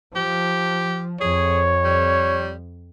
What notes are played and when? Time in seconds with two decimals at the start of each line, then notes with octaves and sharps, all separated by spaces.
0.15 F3 G4
1.21 F2 G#4 C#5
1.84 G3